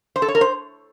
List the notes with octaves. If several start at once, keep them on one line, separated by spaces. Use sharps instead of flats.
C5
A4
C#5
A#4
C5